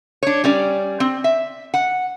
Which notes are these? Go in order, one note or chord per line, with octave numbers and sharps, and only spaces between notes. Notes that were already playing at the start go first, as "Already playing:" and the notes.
D4 C#5
G3 C#4 D5
C4
E5
F#5